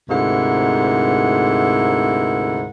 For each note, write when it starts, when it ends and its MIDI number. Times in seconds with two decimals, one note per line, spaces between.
0.09 2.69 38
0.09 2.69 44
0.09 2.69 48
0.09 2.69 64
0.09 2.69 70
0.09 2.69 78